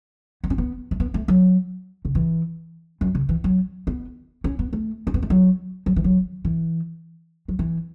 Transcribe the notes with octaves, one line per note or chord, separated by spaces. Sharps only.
B3
C#4
B3
A3
B3
A3
F#3
C#3
E3
F#2
C#3
E3
F#3
B3
C#4
B3
A3
C#4
B3
A3
F#3
F#3
E3
F#3
E3
F#3
E3